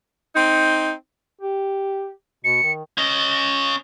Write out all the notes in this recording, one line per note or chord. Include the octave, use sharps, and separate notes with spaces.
C4 D#4
G4
B2 C#7
D#3
C#4 D#5